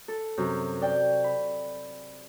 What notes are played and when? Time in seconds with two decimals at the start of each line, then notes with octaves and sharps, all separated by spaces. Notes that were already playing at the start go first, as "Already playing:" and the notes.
0.08 A4
0.38 F#2 C3
0.81 D5 G5
1.24 B5